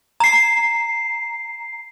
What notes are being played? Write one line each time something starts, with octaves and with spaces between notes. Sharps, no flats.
A#5 C7